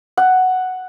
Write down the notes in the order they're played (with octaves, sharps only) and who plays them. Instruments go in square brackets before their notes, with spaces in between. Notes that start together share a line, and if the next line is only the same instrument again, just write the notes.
[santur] F#5